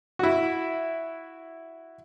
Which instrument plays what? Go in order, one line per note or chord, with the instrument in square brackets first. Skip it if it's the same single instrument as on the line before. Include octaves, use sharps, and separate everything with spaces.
[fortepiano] E4 F#4